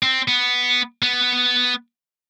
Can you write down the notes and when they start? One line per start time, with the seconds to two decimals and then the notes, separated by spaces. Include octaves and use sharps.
0.03 C4
0.28 B3
1.02 B3